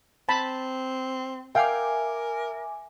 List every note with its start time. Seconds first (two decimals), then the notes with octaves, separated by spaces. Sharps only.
0.29 C4 A5 B5
1.55 A#4 E5 F5 G5 G#5 D6